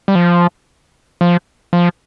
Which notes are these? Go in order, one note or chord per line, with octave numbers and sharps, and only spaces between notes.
G3
F3
F3
F3